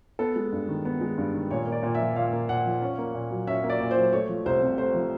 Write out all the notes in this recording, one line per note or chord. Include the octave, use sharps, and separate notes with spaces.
B3 A4
G#3
G2
D#3
B3
G#3
G2
D#3
A#2 C#5
A#3
D5
A#2
E5
F3
A#2 F5
A#3
A#2 F#5
F3
C#4
A#3
A#2
F#3
C#4 E5
A#3
D5
A#2
C5
F#3
A3 C#5
F3
C2 C5
C3
A3 C5
F3